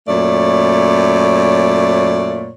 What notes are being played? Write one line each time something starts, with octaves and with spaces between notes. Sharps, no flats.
F#2 A#2 A3 C#5 D5